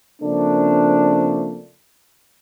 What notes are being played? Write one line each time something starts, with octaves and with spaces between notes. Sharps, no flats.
C#3 F3 A3 A#3 C4 D4